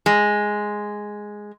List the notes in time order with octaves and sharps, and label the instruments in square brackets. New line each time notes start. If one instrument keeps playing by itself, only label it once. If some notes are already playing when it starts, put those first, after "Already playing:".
[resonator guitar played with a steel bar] G#3